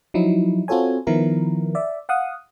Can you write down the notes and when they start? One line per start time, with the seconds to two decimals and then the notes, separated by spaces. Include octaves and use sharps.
0.14 F3 F#3 D#4 E4
0.68 C4 F4 F#4 A4 C#5 G#5
1.07 D#3 F3 B3 E4 A#4
1.75 D5 E5
2.09 F5 F#5 D#6